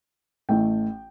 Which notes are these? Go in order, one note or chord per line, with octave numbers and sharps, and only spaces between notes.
A1 A2 A3 G5